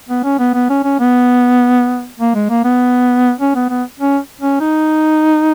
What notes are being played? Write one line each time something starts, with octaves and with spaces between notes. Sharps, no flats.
B3
C#4
B3
B3
C#4
C#4
B3
A#3
G#3
A#3
B3
C#4
B3
B3
C#4
C#4
D#4